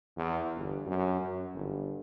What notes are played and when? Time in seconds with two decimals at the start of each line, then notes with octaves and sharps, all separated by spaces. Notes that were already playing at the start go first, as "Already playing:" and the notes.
0.17 E2
0.55 G1
0.86 F#2
1.21 F#2
1.54 G1